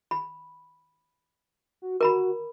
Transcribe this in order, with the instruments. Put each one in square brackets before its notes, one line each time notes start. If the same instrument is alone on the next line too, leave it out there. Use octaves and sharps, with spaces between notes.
[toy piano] B5
[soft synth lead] F#4
[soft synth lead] F#4 [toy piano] A#4 A#5 B5